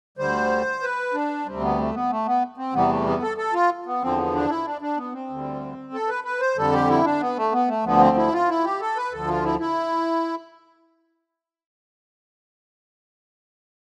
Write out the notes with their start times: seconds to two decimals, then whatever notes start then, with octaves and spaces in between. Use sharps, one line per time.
0.18 D2 D3 G3 C5
0.83 B4
1.14 D4
1.46 D2 C3 G3 C4
1.62 B3
1.78 A3
1.94 B3
2.10 A3
2.26 B3
2.58 C4
2.74 E2 C3 E3 G3 B3
2.89 A3
3.06 B3
3.22 A4
3.37 A4
3.53 F4
3.86 B3
4.02 E2 D3 F3 C4
4.18 B3
4.34 D4
4.49 E4
4.65 D4
4.82 D4
4.97 B3
5.13 C4
5.30 D2 D3 G3
5.94 A4
6.08 B4
6.24 B4
6.40 C5
6.57 F2 D3 G3 A4
6.72 G4
6.89 E4
7.05 D4
7.21 B3
7.37 A3
7.52 B3
7.68 A3
7.84 D2 D3 F3 B3
8.00 C4
8.17 E4
8.33 F4
8.48 E4
8.64 G4
8.81 A4
8.96 B4
9.12 D2 D3 F3 A4
9.28 F4
9.44 E4
9.60 E4